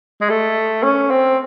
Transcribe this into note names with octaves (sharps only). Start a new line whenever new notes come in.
G#3
A3
C#4
C4